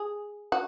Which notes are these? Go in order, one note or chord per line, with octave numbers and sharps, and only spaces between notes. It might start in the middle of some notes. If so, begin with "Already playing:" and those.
Already playing: G#4
F#4